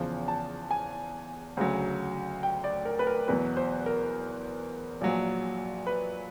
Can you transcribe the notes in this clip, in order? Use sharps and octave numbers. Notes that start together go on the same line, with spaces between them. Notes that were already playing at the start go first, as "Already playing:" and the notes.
Already playing: E2 C#3 F3
A5
G#5
D2 C#3 F#3
G5
D5
A#4
B4
A#4
E2 B2 F#3 B4
C5
A#4
A#1 A#2 F#3
B4